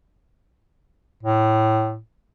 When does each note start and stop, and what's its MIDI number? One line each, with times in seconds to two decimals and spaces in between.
1.23 1.99 45